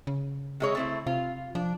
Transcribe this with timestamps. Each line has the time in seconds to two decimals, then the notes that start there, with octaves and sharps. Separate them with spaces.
0.07 C#3
0.60 C3 G#3 C#5
0.75 A3 C4 E4
1.06 C3 F4
1.55 F3 D4